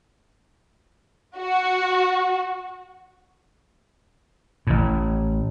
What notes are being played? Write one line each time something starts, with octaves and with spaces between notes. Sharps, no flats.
F#4
A1 A2